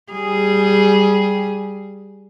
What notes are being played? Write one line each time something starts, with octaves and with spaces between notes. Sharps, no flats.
G3 G#4